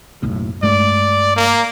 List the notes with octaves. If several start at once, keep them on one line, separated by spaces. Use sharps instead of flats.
F#1 B1 A2
G2 G#3 A3 D5
A#3